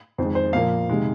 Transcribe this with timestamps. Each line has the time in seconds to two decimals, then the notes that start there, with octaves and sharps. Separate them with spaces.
0.18 F2 D#3 G#3 C5
0.35 C5
0.53 A#2 F3 A#3 F5
0.89 C3 D#3 G#3